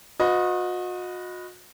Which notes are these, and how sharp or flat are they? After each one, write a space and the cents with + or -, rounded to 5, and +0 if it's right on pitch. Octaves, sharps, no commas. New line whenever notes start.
F#4 -40 B4 +15 D#5 +0